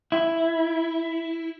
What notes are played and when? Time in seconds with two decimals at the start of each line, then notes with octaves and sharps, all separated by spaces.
0.12 E4